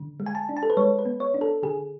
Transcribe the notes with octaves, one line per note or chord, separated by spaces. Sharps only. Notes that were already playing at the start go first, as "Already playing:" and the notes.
Already playing: D3
G#3
G#5
A5
D4
A5
A4
B4
G#3 C#5
B4
B3
C#5
D4
A4
D3 G#4